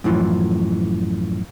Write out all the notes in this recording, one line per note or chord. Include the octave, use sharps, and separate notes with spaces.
F#2 A2 E3 F3